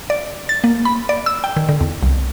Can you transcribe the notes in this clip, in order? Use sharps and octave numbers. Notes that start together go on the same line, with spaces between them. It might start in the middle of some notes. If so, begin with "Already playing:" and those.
D5
A6
A#3
B5
D5
E6
G5
D#3
D3
E2
C2